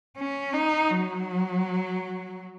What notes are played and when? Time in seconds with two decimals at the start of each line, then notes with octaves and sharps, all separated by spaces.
0.18 C#4
0.54 D#4
0.90 F#3